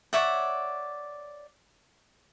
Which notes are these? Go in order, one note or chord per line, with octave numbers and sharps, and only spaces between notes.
C#5 D5 E5 F#5